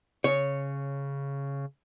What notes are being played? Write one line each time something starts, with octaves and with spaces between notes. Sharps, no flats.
C#3 C#5